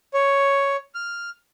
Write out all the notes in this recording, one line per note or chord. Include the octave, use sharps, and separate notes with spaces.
C#5
F6